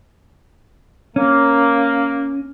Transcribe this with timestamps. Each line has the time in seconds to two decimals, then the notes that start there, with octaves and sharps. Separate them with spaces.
1.16 A#3 C#4